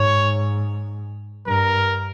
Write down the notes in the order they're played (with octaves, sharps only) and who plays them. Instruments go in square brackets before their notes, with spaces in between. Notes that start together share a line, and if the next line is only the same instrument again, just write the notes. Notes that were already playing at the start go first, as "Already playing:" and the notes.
Already playing: [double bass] G#2 [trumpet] C#5
[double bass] G2 [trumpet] A#4